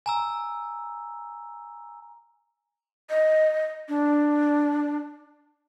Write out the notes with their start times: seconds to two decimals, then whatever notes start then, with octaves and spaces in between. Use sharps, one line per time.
0.06 G#5 A#5 E6
3.10 D#5
3.89 D4